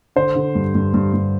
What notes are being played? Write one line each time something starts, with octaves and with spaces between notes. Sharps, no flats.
D3 C5
D3
G2
G2
G2
G2